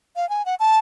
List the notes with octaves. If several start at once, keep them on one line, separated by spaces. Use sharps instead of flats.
F5
G#5
F#5
A5